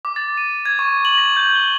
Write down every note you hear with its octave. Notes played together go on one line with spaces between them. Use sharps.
D6
A6
D#7
G#6
C#6
F#7
A#6
G6
G7